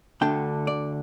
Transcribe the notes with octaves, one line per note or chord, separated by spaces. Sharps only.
D2 D3 A3 D4 G5
D5